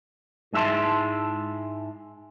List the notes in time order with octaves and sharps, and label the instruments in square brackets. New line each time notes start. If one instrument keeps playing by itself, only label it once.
[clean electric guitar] G#2 G#3 E4 E5 A5 C6